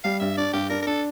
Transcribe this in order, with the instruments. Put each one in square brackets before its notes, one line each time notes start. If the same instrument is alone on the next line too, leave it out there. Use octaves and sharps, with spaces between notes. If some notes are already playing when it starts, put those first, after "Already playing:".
[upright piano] G3 [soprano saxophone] F5
[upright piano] G2 [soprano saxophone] E5
[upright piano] D4 [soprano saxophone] D5
[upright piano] G2 [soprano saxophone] G4
[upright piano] D4 [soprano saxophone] A#4
[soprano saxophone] A#4
[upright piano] D4 [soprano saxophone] A4